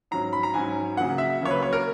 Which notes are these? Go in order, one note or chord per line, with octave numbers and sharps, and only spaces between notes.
G#2 F#3 C#4 A#5
B5
A#5
G#2 F#3 C#4 G#5
C#3 F#3 A#3 F#5
E5
C#3 F#3 A#3 C#5
B4
C#5
A#4